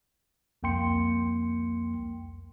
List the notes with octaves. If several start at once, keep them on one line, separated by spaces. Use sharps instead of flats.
C2 F2 A#3 G5 C6 C#7